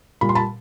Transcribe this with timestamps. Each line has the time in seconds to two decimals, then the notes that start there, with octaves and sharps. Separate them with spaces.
0.21 A#2 G3 B5
0.29 C6
0.35 A5 B5